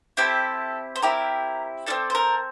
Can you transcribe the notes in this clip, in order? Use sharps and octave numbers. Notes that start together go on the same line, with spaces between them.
C4 E4 G4 A4
C5
C4 E4 G4 A#4
C4 F4 A4 D5
C5
A#4